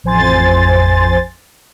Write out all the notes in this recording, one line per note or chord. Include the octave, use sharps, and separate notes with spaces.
A1 F2 C5 G#5 C6 A6